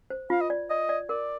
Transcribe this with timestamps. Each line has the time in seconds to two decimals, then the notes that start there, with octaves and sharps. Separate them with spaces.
0.10 C5
0.30 F4 F5
0.41 D#5
0.50 D5
0.70 D5 D#5
0.89 D5
1.09 A#4 D5